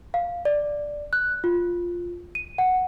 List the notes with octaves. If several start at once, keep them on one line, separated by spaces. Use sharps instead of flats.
F5
D5
F#6
F4
D#7
F#5